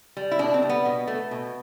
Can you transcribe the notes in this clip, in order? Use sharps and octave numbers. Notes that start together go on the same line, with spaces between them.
G3
E4
B2 D4
C4
G3
B3
B2
A3
B2